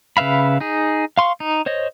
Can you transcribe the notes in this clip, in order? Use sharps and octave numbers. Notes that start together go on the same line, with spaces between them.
C#3 B4 E5 F5 B5
D#4 G#4
F5 C6 C#6
D#4
C5 C#5 D#5